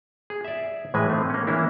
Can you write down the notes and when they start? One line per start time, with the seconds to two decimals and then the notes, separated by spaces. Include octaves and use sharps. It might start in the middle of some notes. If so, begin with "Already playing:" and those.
0.30 G#4
0.44 D5 E5
0.94 A2 E3 G#3 B4 G#5
1.10 A3 C4
1.30 A#3 C#4
1.47 E3 A#3 C#4 D4 E4